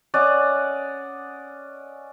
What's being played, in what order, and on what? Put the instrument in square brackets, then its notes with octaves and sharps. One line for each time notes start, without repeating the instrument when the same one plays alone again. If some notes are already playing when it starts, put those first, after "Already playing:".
[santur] C#4 D5 D#5 F#5